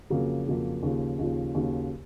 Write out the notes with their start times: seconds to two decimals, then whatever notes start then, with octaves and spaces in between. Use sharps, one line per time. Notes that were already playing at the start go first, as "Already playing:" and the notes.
0.10 F2 C#3 F#3 A#3
0.47 F2 C#3 F#3 A#3
0.83 D#2 C#3 F3
1.19 D#2 C#3 F3
1.55 D#2 C#3 F#3